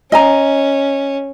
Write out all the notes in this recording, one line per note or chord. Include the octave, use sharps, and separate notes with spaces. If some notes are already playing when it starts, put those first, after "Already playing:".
C#4 D#5 G#5 A#5